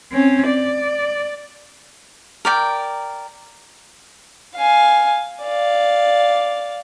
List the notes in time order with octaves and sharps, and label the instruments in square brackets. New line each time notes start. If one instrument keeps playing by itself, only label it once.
[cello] C4 C#4
D5
[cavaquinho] A#4 D5 G5
[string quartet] F5 G#5
D5 F5